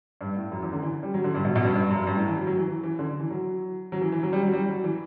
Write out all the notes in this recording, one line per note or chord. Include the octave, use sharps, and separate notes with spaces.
G2
A2
F#2
E2
D3
E3
G3
F#3
D3
G2
B2
B2
G2
G2
F#2
G2
A2
E3
F#3
F#3
E3
E3
E3
D3
E3
F#3
F#3
E3
E3
F#3
G3
F#3
G3
F#3
E3